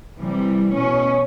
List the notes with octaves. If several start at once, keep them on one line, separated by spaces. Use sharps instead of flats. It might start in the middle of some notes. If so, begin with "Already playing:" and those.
C3 E3 G3
B2 C#4